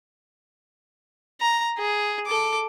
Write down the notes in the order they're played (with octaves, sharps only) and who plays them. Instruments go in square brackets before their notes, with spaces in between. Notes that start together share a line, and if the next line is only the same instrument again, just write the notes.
[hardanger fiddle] A#5
G#4
A4 D6